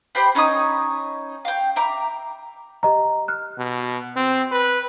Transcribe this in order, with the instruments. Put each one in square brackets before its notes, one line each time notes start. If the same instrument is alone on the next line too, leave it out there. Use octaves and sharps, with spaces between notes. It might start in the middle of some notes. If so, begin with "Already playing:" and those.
[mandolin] G4 C5 G5 B5
C#4 D#4 C#5 D#6
F5 G5
E5 A#5 D6
[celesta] G4 D#5 A#5
F6 F#6
[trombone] B2
C4
B4